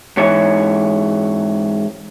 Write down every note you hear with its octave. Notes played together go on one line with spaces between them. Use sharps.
G#2 E3 C#5